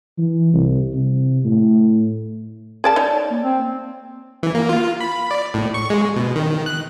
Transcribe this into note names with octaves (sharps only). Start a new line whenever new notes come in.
E3
C2
C3
A2
G#4 A#4 D5 A5
D#4 C#5 D5
A#3
C4
E3
A#3
F4
B5
D5
A2
C#6
G#3
B2
D#3
F#6